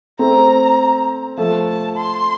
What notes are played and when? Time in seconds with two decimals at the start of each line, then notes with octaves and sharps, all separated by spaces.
0.19 A3 C4 A#5
1.37 F3 A3 A5
1.68 A5
1.97 C6